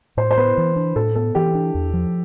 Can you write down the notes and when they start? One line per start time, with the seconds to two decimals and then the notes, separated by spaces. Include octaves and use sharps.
0.17 A2 C5
0.31 C5
0.38 B3 B4
0.57 E3
0.76 D4
0.96 A2 A4
1.15 B3 A4
1.35 E3 G4
1.55 D4
1.75 E2
1.93 F3